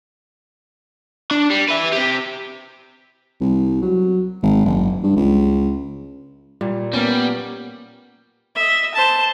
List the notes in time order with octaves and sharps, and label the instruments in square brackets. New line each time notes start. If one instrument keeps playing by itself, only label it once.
[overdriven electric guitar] D4
G3
B4 E5
C4 G4
[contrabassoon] C2
F#3
G#1
F#1
G2
C#2
[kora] A#2 [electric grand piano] G3
[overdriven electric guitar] G3 [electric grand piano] A#3 C#4 [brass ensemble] B3
[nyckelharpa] D#5 E5
C5 A5